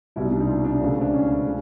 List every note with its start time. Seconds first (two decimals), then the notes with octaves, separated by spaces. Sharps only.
0.16 C2 B2 G3 E4
0.24 D#4
0.32 D4
0.40 D#4
0.48 F4
0.64 D4
0.80 C#2 C#3 F3 A3
1.01 D4
1.12 C#4
1.46 C#3